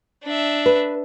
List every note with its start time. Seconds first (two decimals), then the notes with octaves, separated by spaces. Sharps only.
0.23 D4 E5
0.66 B4